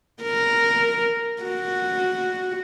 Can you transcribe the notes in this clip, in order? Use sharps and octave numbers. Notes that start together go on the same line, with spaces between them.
A#4
F#4